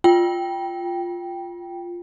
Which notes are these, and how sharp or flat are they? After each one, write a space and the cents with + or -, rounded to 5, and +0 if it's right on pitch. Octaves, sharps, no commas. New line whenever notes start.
F4 +0 G5 +0